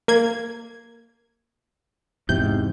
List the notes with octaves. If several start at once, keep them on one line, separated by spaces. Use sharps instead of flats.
A#3 G#6
E2 G#2 C3 G6